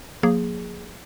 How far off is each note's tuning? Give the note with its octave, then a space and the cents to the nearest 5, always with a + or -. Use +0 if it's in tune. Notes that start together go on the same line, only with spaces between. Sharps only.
F3 +45 A#3 +0 G#4 +0